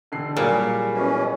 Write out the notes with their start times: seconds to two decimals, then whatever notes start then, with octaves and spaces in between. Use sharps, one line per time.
0.12 E1 D3 C7
0.36 A#2 F#3 G3 G#4 D5 G#5
0.94 B2 E3 C#4